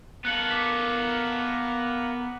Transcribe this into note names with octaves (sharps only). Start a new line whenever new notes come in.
A#3 B3 A4 A#4 A#5 F#6 C#7 F#7
D6 B6 C#7